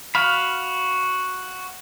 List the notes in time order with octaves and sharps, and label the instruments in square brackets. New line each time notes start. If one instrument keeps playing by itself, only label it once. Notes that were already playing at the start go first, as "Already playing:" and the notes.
[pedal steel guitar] F#4 F5 B5